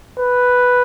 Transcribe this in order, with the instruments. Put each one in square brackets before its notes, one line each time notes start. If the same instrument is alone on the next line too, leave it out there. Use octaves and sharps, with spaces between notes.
[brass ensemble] B4